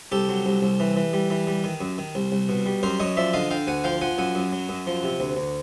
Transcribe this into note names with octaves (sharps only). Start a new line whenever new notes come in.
C2 G4 A4
F#3
C2
C2
E3
E3
G3
E3
G3
D#3
F#2
D#3
C2
C2
B2
G3
F#2 A#4 C5
F#2 C#5 D#5
F3 D5 E5
D3 D#5 F5
D3 F5 G5
D2 F#5 G#5
F3 F5 G5
F3 F#5 G#5
F#2 F#5 G#5
F#2
F#3
F#2
F3
C3
D2
D2